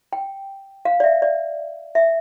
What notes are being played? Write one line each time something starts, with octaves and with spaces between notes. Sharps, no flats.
G5
F5
D5
E5
D5
E5